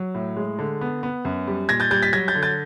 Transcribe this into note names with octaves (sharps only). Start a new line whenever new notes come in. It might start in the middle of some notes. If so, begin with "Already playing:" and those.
Already playing: F#3
A2
G#3
D3
B3
B3
F#2
G3
A#2 G#6 A#6
G6 A6
G3 G6 A6
A6 B6
F#3 G#6 A#6
G6 A6
D3
G6 A6